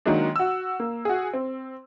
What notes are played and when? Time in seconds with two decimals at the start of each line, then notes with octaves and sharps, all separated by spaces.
0.06 D#3 F#3 G#3 A#3 D4
0.36 F#4 E6
0.80 A#3
1.05 F#4 G#4
1.33 C4